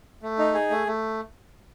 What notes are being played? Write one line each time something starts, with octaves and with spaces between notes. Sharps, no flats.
A3
D#4
G#4
A3
A3